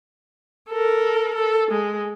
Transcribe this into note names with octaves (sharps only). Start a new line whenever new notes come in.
A4 A#4
A4
G#3